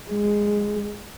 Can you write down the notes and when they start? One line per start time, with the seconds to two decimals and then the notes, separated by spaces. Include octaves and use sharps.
0.10 G#3